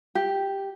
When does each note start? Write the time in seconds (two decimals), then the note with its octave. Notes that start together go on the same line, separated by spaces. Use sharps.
0.15 G4